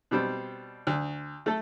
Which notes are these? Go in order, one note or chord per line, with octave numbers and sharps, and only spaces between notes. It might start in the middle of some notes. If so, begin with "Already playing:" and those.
B2 G3 C4
D2
A3 A4